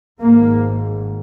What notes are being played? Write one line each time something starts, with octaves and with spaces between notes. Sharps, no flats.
G#1 G#2 A#3